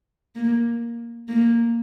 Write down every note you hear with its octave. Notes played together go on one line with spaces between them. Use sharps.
A#3
A#3